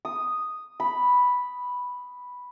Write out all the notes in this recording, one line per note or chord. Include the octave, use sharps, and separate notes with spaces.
D#6
B5